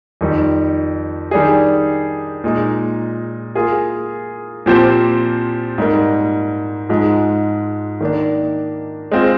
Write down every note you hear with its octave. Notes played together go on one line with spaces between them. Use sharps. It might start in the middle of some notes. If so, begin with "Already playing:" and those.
F2 D#3 G3
D#3 G3 D4 G#4
A#2 G#3 D#4
A#3 F4 G#4
A#2 F3 C4 G4 C5
G#2 G3 A#3
G#2 F3 G#3
D#3 A#3 D4
G#3 C4 F4